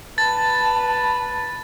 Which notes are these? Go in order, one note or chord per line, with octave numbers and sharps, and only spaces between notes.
B4 A5 A6